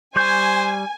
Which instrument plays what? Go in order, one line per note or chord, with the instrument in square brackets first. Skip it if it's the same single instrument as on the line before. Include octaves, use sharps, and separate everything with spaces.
[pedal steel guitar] G3 C#6 G6 [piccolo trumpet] C5 [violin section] G#5